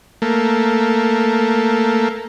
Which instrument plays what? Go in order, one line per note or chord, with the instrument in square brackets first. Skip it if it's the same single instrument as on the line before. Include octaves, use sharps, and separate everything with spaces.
[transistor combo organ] A3 A#3